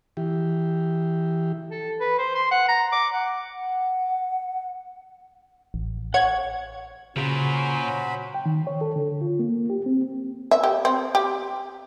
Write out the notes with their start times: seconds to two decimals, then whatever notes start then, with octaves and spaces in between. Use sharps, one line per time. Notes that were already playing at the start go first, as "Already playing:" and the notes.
0.17 E3 G4
1.71 A4
2.00 B4
2.18 C5
2.35 C6
2.51 F#5
2.68 A#5
2.92 D6
3.13 F#5
3.55 F#5
5.74 A1
6.14 C#5 F#5 G#6
7.16 A#2 C#3 F#3 C#4 F#4 C5 B5
8.34 G5
8.46 D#3
8.67 C#5
8.81 A4
8.96 D3
9.21 F4
9.39 A#3
9.70 G4
9.86 C4
10.51 E5
10.64 G4
10.85 C4
11.15 G4